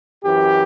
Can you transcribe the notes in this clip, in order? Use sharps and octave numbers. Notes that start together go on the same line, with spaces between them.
F#2 E3 G4